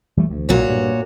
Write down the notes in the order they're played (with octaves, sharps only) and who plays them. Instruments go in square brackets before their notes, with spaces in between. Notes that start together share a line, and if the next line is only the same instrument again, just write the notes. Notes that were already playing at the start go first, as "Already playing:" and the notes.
[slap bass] E3 G3 A3
D2
[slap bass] B1 [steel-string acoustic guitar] A#2 F#4 C#5
[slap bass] G2